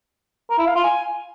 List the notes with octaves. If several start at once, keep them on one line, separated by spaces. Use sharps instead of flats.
A#4
E4
F5
F4
G#5